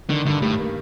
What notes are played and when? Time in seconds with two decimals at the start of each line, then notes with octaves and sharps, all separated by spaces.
0.10 D3 D#3
0.26 G2 D3
0.42 A2 G3
0.59 A#3